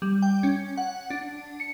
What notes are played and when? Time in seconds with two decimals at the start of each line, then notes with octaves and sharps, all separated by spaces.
0.02 G3
0.22 G5
0.43 C#4
0.78 F#5
1.10 D4
1.60 C#7